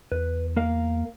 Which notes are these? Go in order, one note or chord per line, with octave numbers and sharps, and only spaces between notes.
E2 B4
A#3 A#4 F5